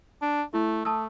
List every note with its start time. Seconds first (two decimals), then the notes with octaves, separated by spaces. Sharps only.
0.22 D4
0.54 A3 E4
0.85 A3 A5 D#6 E6